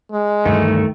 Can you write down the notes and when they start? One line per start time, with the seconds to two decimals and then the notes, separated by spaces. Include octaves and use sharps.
0.12 G#3
0.46 D2 G2 D#3 E3 A3